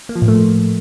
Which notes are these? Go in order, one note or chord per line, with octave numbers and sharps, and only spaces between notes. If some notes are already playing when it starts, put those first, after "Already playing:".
A#3
F3
A2
A3
F3